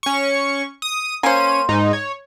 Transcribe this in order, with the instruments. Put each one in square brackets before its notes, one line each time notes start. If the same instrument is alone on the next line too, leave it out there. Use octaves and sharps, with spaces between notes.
[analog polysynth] C#4 C#6
D#6
[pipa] A#3 C5 [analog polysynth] C#4 D#7
[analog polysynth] G#2 D#4
C#5